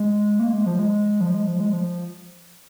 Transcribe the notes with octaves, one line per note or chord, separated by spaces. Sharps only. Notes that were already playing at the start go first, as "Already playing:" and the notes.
Already playing: G#3
A#3
G#3
F3
G#3
F3
G#3
F3
G#3
F3